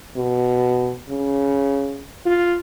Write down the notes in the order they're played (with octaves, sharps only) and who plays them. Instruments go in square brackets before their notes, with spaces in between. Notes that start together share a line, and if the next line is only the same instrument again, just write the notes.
[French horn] B2
C#3
F4